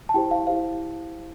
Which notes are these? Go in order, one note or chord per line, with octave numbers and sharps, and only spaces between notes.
A5
E4 G4 C5 G5
F5
E4 G4 C5 F5